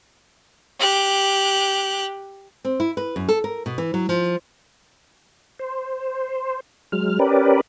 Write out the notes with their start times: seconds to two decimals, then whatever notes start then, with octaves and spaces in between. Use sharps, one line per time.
0.79 G4 F#6
2.65 C4
2.80 E4
2.97 B4
3.16 F#2
3.29 A4
3.44 A#4
3.66 B2
3.78 E3
3.94 F#3
4.09 F3
5.59 C5
6.92 F#3 G#3 F6
7.19 C#4 G4 A#4 B4 D5